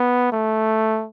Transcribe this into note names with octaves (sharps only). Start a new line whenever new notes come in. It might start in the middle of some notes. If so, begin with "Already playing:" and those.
Already playing: B3
A3